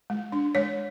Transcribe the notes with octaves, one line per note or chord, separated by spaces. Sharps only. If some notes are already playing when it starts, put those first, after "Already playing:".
G#3
D4
G#3 C#5